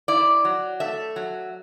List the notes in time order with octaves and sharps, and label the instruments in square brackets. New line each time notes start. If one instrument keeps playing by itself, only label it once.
[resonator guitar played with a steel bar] E4 D5
F#3
A3 E5
F#3